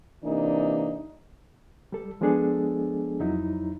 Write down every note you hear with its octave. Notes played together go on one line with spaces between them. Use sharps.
C3 E3 A#3 D4 D#4
G3 A4
F3 G#3 B3 D4 G#4 A4
F2 F#3 D#4 E4